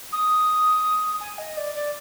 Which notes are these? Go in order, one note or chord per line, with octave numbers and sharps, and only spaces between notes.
D#6
G#5
D#5
D5
D5